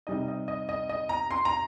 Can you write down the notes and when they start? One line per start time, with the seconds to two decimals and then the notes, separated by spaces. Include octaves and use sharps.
0.07 C3 G3 D#4 D#5
0.28 D#5
0.48 D#5
0.69 D#5
0.89 D#5
1.09 A#5
1.31 C6
1.45 A#5